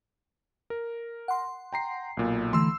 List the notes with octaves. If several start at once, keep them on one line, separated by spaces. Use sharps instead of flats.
A#4
F#5 C6
G5 A#5 C7
B1 A#2
D3 E3 A3 C6 E6